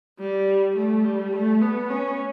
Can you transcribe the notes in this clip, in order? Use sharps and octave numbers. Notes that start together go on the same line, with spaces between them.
G3
A3
G3
A3
B3
C#4